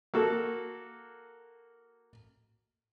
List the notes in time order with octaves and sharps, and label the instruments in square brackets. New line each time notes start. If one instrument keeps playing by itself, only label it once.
[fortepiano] A#3 F#4 A4